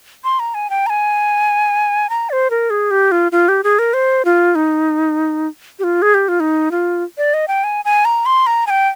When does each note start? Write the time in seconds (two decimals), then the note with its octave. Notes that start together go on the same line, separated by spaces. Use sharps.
0.24 C6
0.40 A#5
0.54 G#5
0.70 G5
0.86 A#5
0.90 G#5
2.10 A#5
2.30 D5
2.33 C5
2.50 A#4
2.70 G#4
2.91 G4
3.12 F4
3.32 F4
3.48 G4
3.64 G#4
3.79 A#4
3.94 C5
4.25 F4
4.55 D#4
5.79 G4
5.84 F4
6.02 G#4
6.14 G4
6.28 F4
6.40 D#4
6.71 F4
7.18 D5
7.34 D#5
7.48 G5
7.64 G#5
7.85 G#5
8.05 A#5
8.26 C6
8.47 A#5
8.67 G#5
8.70 G5